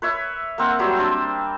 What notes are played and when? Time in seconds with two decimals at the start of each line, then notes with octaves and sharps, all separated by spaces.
0.02 B4 C#5 E5
0.58 A#3 C4 F#5
0.79 F#3 G3 G4 C5
0.96 C4 D4 C5